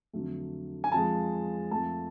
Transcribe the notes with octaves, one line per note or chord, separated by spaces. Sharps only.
F2 D3 F#3 A3
G#5
F2 F3 G#3 A5
F2 F3 A3 A5